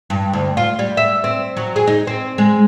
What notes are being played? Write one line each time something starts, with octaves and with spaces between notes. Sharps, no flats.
G2
D2
F4
G3
E5
C4
F#3
G#4
D#4
C4
G#3